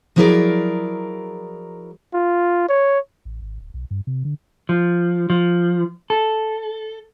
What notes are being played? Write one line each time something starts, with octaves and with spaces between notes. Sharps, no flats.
F3 F#3 E4 G#4 A#4 D5
F4
C#5
A1
G#1
D1
B1
G2
C3
D3
F3
F3
A4